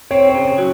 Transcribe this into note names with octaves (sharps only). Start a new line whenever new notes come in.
C4 C#5
C#5
C#3
F#3